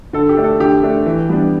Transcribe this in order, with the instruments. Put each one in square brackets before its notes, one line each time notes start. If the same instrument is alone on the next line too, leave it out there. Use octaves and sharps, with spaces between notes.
[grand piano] D3 A4
G4
A3 D4
A4
D3 G4
A3 D4
E3
G3 B3 D4